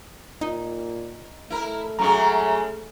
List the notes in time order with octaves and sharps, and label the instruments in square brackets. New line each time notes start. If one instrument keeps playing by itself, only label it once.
[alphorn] A#2 [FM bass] D#4
[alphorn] A3 [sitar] E4 A#4
[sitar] F#2 C#3 G#3 [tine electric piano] A#5 C#6